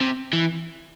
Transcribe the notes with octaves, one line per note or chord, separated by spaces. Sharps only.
C3
E3